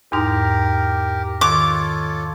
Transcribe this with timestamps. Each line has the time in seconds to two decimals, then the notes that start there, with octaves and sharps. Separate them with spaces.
0.12 E2 G#2 D#4 G4 A#4
1.41 D#3 F4 A4 C#5 D6